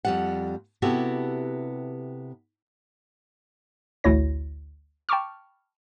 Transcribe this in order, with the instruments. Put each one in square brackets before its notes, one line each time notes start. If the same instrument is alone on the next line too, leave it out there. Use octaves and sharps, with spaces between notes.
[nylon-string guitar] F2 G3 F#5
C3 B3 E4 F#4 G4 A4
[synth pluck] A1 D2 E4 F#4 C#5 A#6
G5 A5 B5 C#6 D6 F6